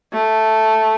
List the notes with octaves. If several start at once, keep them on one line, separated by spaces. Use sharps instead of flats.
A3